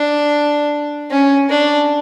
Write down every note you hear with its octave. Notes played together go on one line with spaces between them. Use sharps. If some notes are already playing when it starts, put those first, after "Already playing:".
Already playing: D4
C#4
D4